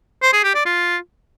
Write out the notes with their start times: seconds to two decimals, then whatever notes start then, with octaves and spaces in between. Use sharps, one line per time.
0.22 C5
0.33 G#4
0.44 G4
0.55 D5
0.66 F4